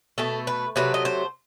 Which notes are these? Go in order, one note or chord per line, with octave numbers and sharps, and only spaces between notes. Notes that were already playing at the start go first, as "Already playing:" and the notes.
B2 A3 A4
B4
C3 F#3 A3 B4
D#5
C5